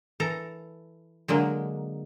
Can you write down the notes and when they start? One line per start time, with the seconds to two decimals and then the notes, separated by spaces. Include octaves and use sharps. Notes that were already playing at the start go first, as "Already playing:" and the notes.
0.20 E3 A4 A#5
1.28 D3 F#3 G#3 A#3